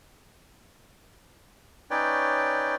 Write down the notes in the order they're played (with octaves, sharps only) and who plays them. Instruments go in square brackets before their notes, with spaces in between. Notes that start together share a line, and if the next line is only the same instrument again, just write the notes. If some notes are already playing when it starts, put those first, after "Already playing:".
[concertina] C#4 D#4 B4 C#5 D5 G5